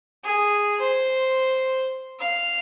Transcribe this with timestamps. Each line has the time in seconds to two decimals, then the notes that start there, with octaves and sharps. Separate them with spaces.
0.24 G#4
0.80 C5
2.20 F5